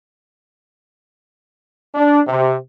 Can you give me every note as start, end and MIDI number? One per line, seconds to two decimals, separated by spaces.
1.95 2.20 62
2.28 2.54 48